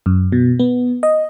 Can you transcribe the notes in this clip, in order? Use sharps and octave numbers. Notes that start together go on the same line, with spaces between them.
F#2
B2
B3
D#5